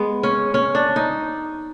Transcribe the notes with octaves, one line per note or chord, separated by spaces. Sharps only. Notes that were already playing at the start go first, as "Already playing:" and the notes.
Already playing: G#3 B3
C#4
C#4
D4
D#4